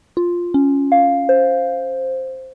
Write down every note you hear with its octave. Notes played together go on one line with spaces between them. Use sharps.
F4
C#4
F5
C5